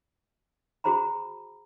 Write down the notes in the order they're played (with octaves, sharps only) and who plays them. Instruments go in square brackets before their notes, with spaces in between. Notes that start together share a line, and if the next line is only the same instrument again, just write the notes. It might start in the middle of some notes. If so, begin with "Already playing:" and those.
[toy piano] F#4 G#4 C5 A#5 B5